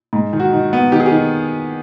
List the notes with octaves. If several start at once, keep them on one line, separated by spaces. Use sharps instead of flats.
G#2
D#3
F#4
D#3
B3
D#3 G4
G#4
G4
D#3